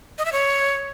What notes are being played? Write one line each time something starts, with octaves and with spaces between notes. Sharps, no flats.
D#5
E5
C#5